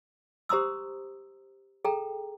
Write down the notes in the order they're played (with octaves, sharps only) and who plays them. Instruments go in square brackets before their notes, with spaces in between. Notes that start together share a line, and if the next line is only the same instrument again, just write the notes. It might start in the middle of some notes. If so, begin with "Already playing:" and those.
[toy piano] G4 C5 A#5 C6 D#6 E6
G#4 A4 G5 A#5